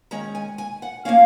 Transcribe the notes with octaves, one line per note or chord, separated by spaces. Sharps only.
D#3 G#3 C#4 A#5
G#5
G#5
F#5
F3 A#3 C#4 F5